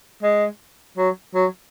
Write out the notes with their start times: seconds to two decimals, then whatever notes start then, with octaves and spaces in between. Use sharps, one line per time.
0.23 G#3
0.98 F#3
1.35 F#3